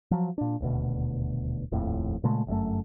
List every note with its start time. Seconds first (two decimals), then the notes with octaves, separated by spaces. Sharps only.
0.11 F3 F#3
0.38 A#2 D4
0.61 D#1 D2 B2
1.72 D#1 A#1 F2 A2
2.24 A#2 C#3 G#3 A3
2.47 G1 F#2 A#2 A3